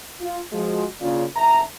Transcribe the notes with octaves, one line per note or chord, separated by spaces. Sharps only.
F4
F3 G#3 F#4
C#3 A#3 D4 F4
F#1 B1 E5 A5 A#5